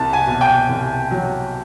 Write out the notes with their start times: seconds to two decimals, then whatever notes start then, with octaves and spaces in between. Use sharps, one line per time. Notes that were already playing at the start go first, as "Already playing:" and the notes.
Already playing: C2 A5
0.13 G#5
0.27 B2
0.41 G5
0.69 C2
1.11 F#3